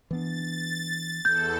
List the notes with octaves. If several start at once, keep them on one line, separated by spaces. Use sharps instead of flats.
E3 B3 D4 A6
E2 A4 G6